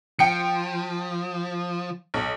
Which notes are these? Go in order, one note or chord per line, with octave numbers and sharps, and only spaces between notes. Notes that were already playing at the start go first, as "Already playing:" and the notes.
F3 G5 C#7
B1